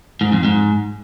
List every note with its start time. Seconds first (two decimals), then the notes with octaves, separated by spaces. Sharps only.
0.21 G#2
0.32 F2
0.44 G#2